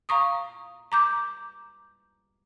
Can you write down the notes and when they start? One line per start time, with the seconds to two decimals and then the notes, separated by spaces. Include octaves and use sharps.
0.09 F5 A#5 C#6 D#6
0.92 A#5 D6 G6